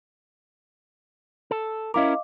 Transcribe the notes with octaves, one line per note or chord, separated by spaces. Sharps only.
A4
C#4 E4 A#4 D#5 F5 D6